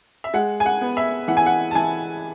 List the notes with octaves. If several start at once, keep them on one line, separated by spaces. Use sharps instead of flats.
E5
G#3 F#5
G#5
F#5
B3
E5
E3 F#5
G#5
F#5
A5
E3 G#5